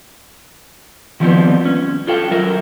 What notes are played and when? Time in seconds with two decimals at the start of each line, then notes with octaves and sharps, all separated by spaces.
1.20 D#3 F3 G3 B3 C4
1.65 C#4
2.07 F4 A4 F#5 G5
2.31 F#3 F4 A#4 E5